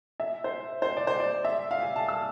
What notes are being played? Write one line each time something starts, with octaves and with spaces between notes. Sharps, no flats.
E5
C5
C5
D5
C5
D5
E5
F5
G#5
A5
E6